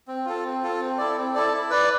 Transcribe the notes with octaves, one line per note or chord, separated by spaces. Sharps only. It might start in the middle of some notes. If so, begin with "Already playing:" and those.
C4
F4 A4
C4
F4 A4
C4
E4 A4 D5
C4
E4 A4 D5
E4
B4 D5